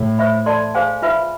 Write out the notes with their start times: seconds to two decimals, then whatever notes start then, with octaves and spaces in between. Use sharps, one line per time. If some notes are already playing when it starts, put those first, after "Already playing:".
Already playing: A2
0.19 C5 E5 B5
0.46 A4 D5 A5 C6
0.75 G#4 C5 F5 G#5
1.02 F4 B4 E5 B5